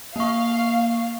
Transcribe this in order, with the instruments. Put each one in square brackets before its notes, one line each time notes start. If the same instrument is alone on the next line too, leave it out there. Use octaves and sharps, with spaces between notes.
[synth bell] A#3 C#6 [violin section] F5